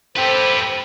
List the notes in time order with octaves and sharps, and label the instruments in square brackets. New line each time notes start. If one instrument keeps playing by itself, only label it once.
[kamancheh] C4 A4 [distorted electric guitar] G4 B4 [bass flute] C5